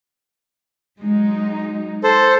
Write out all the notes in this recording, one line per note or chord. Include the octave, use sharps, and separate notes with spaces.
F#3 G#3 D#4
A4 C5